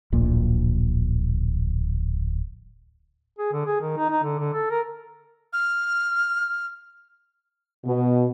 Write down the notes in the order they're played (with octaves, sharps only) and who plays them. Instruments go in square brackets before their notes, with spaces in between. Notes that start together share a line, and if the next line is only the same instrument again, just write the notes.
[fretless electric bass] D1 A#1 A#2
[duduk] G#4
D3
G#4
D#3
D#4
D#4
D3
D3
A4
A#4
[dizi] F6
[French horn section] B2